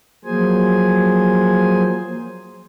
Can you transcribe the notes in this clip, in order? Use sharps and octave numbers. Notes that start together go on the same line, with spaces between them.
F3 F#3 A#3 G#4 C5 G#5